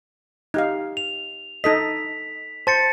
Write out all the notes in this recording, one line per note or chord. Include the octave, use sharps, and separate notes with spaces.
D#4 G4 F5
F7
D#4 A4 D#5 B6
C5 A5 A6 C#7